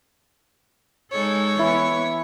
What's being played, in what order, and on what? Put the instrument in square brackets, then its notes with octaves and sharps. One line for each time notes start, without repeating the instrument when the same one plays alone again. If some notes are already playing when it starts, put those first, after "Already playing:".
[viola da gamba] G#3 D#4 A4 [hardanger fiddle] C#5
[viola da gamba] E3 B3 [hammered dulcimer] E4